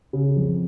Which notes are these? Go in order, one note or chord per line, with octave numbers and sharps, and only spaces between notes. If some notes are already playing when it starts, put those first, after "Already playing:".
C#3
F2